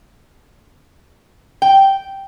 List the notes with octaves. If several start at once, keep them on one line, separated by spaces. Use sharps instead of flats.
G5